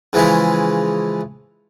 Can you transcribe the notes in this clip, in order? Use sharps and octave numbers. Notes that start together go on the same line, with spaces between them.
C#3 E3 F3 G#3 E4